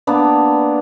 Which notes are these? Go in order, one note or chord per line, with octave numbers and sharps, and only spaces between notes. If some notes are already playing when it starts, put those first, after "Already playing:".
A#3 B3 D4